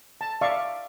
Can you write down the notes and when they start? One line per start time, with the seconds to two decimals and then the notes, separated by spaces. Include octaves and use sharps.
0.21 A5
0.41 D5 E5 F5 C#6